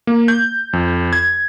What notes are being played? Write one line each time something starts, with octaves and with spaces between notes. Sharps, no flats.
A#3
G6
F2
G#6